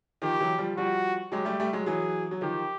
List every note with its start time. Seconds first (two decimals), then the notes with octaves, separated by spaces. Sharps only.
0.22 D#3 F3 G4
0.40 E3 F#3
0.58 F3 G3
0.77 F3 G3 F#4
1.32 F#3 G#3 G4
1.45 G3 A3
1.60 G3 A3
1.73 F#3 G#3
1.86 E3 F#3 G#4
2.31 F#3
2.41 D#3 F3 G4